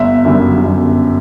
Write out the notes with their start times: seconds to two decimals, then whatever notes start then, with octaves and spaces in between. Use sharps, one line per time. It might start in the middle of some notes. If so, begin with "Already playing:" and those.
Already playing: G1 E5
0.25 F#2 D3 G3
0.65 G1